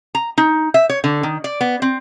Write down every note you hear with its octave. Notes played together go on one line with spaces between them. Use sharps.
A#5
D#4
E5
C#5
D3
D#3
D5
B3
C4